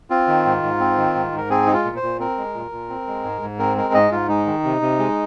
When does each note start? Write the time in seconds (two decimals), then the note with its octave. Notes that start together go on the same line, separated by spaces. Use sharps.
0.10 C4 F4
0.27 D#3
0.46 G#2
0.63 G#2
0.80 C4
0.97 D#3
1.15 G#2
1.32 G#2
1.37 A#4
1.50 C4 G#4
1.66 G#3 D#4
1.73 F4
1.85 A#2
1.96 C5
2.02 A#2
2.20 C4 A#4
2.38 G#3
2.54 A#2
2.71 A#2
2.89 C4
3.07 G#3
3.24 G#2
3.42 G#2
3.59 C4 A#4
3.77 G#3 A#4
3.94 G#2 D#5
4.12 G#2 F4
4.29 G#3 D#4
4.46 D#3
4.64 C3
4.81 C3
4.99 G#3